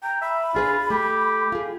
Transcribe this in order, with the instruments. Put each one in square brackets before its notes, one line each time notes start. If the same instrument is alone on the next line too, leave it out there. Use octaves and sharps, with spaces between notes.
[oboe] G5 [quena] A#5
[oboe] E5 [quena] B5
[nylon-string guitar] D4 G#4 B4 [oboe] F4
[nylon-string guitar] A3 [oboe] G4
[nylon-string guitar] F4 G#4